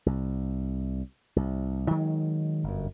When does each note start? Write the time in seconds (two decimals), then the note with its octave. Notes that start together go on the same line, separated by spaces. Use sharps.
0.06 C2
1.36 C2
1.91 D#3 F#3 G#3
2.64 G1 F#2